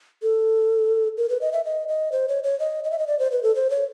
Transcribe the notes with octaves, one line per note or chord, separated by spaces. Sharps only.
A4
A#4
B4
D#5
E5
D#5
D#5
C5
C#5
C#5
D#5
D#5
E5
D#5
D5
C5
B4
A4
C5
C#5